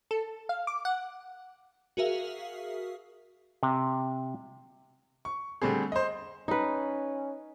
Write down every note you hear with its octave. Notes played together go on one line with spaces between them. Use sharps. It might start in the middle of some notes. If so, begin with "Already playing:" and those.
A4
F5
D6
F#5
F#4 G#4 A#4 E5 F5
C3
C#6
D3 G3 A3 C4 G#4
C5 D#5
C#4 D#4 B4